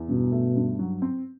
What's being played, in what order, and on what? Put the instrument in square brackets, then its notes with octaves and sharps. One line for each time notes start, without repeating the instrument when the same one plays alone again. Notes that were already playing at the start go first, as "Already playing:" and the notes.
Already playing: [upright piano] E2
[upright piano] G2 [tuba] B2
[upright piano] A3
G2
F#3
C4